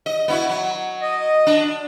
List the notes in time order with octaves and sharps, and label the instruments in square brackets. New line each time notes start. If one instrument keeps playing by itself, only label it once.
[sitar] D#5
B3 E4 F#4
F#3
[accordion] D#5
[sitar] D4